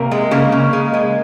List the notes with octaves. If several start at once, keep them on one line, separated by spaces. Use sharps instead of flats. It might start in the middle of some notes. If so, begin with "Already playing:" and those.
Already playing: C3 A#3 A#4
G#3
C#3 A#3 A#4
C#3
G#3
G#3